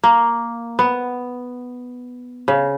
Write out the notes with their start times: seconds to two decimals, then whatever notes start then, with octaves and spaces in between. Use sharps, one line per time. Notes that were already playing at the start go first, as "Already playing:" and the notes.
0.04 A#3
0.79 B3
2.48 C#3